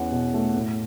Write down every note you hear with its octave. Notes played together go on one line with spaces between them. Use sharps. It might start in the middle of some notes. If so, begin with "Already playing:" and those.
Already playing: E2 C#4 F#5
B2
A3
A2